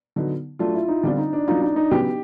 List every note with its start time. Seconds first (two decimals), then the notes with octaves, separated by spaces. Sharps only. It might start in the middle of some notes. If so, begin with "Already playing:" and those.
0.16 D3 F#3 B3 D#4
0.59 F#3 A3 D4 F4
0.74 E4
0.88 D#4
1.03 D3 G3 C4 D4 F4
1.18 D#4
1.33 D4
1.48 F#3 A#3 C#4 D#4 F4
1.62 D#4
1.76 D#4
1.91 C#3 F#3 B3 G4